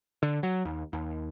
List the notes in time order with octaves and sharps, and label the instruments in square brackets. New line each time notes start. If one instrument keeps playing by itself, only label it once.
[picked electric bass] D3
F#3
D#2
D#2